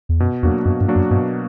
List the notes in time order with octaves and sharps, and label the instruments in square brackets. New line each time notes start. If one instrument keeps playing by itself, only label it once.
[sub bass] E2
[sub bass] F#2 [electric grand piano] B2
[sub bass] E2 [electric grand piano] F#3 A#3 D4 F#4
[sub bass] F#2 [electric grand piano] B2
[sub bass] G2
[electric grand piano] F#3 A#3 D4 F#4
[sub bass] F#2
[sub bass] G2 [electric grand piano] B2